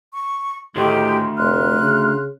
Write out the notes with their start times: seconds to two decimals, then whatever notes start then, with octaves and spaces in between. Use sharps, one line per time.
0.14 C#6
0.76 D2 A2 D#3 G#3 G4
1.38 F1 C6 F6 F#6
1.80 C#3